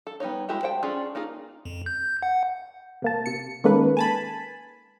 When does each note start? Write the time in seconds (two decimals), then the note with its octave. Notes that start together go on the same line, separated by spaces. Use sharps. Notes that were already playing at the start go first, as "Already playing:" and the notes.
0.07 A4
0.20 G3 B3 D#4 C#5
0.49 G#3 E4 F#4 G4
0.63 C5 F#5 G5 A5
0.83 C#4 D4 F4 G#4 A4
1.15 A#3 D#4 F4 G#4
1.65 F2
1.86 G6
2.22 F#5
3.02 C3 A#3 A5
3.26 C3 C#7
3.64 D#3 G#3 A#3 C#4 A4 B4
3.97 G#5 A5 B5